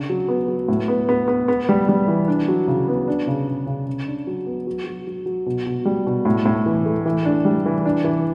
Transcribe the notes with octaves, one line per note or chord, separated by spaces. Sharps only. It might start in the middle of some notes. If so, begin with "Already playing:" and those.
Already playing: C#3 D4
F#3
B3
F#3
A2
B3
B3
B3
B3
G3
G3
E3
D4
F#3
C#3
B3
D4
C#3
C#3
C#3
C#3
D4
F#3
B3
F#3
F#3
F#3
F#3
B2
B2
G3
B2
A2
A2
E3
A3
E3
D4
G3
E3
D4
E3